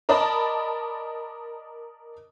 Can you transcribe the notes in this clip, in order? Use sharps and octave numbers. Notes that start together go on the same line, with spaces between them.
A#4 D5 D#5 A5 B5